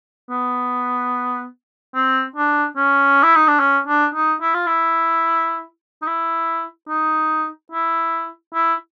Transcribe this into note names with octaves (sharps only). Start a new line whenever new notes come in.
B3
C4
D4
C#4
E4
D#4
D4
C#4
D4
D#4
E4
F4
E4
D#4
E4
D#4
E4
E4